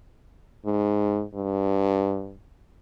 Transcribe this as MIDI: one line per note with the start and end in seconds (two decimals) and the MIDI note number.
0.65 1.23 44
1.35 2.36 43